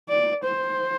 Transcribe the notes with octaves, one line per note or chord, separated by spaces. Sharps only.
D5
C5